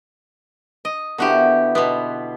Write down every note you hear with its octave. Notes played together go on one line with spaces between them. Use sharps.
D#5
D3 B3 E4 F#4 G4
B2 B3 C6